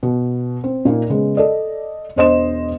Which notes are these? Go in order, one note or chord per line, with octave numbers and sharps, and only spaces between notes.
B2
C4
A#2 A#3 D#4
C#3 G#3 B3
A4 D5 D#5
E1 D4 C5 D#5 C6 E7